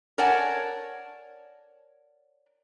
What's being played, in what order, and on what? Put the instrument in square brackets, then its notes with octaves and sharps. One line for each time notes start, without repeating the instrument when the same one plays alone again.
[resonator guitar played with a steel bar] A#4 C#5 D5 F#5 G#5 A5